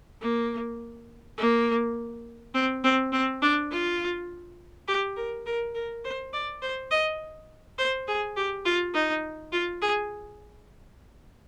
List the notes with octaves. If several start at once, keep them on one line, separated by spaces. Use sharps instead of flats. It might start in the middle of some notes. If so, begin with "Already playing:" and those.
A#3
A#3
C4
C4
C4
D4
F4
G4
A#4
A#4
A#4
C5
D5
C5
D#5
C5
G#4
G4
F4
D#4
F4
G#4